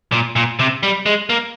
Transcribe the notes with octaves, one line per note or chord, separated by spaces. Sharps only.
A#2
A#2
C3
G3
G#3
A#3